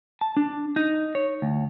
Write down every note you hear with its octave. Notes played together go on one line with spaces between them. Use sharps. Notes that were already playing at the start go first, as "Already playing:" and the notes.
A5
D4
D#4
C#5
D2